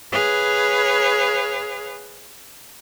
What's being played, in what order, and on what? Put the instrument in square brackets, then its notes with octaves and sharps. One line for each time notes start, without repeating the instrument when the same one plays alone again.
[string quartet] G#4 B4 C#5 F5